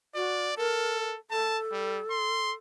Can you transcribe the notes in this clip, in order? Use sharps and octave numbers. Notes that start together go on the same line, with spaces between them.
F#4 D5
A4 A#4
A4 A5
G3
C6